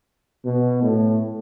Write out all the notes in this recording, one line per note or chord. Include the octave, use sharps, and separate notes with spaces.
B2
A2